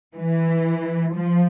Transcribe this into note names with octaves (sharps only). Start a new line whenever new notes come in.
E3
F3